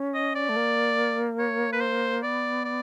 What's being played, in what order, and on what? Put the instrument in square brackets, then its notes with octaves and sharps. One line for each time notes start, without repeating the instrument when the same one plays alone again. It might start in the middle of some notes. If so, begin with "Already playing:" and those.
Already playing: [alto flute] C#4
[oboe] D#5
D5
[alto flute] A3
A#3
[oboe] C#5
B4
C5
[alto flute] B3 [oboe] D5
[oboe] D5